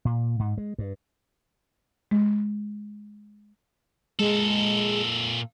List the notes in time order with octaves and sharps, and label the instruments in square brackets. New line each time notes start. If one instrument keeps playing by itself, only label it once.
[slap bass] A#2
G#2
G#3
G2
[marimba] G#3
[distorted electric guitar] A#2 A4 [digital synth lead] G#3